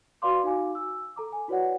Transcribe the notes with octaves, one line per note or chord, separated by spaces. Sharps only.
F#4 B4 D5 F5 C6 D6
D#4 F#4 F5 G#5 D6
E6
A4 A#5 D6
G#5
E4 F#4 B4 C#5 D5 F#5